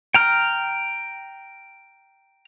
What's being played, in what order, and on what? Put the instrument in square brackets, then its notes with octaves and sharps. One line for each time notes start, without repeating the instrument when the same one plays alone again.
[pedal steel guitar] G5 A#5 F6